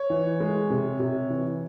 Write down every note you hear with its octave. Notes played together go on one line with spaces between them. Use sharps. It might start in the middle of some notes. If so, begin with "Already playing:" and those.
Already playing: C#5
E3
G#3
C3
C3
E3